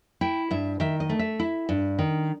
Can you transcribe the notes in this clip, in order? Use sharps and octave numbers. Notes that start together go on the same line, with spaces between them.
E4 G5
G2 E5
D#3 E5
D#5
A3
E5
E4
G2
D#3